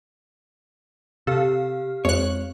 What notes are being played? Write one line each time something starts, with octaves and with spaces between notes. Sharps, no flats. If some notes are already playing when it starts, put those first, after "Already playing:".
C3 G4 A4 F5 F6
F2 G#3 C4 C#5 F#6